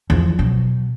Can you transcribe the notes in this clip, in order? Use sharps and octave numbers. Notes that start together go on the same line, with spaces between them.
E2 F3
B2 F#3